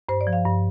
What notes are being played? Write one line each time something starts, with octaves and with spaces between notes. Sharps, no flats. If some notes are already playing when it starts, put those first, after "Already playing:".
G2 C5
D5
F3
F5
G2